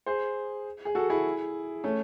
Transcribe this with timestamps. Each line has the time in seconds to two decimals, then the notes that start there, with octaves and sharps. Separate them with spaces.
0.06 G#4 C5
0.85 G#4
0.95 F#4 A4
1.10 E4 G#4
1.84 A3 C#4